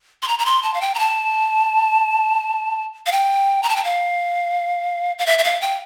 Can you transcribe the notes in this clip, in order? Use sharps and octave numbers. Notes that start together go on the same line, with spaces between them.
C6
A#5
A#5
C6
A5
F5
G5
A#5
A5
F5
G5
A#5
A5
G5
F5
F5
E5
E5
F5
G5